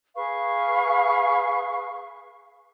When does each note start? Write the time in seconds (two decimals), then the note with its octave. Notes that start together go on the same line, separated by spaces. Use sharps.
0.15 G#4 B4 F5 C#6